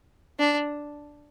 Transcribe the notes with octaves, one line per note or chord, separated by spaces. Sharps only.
D4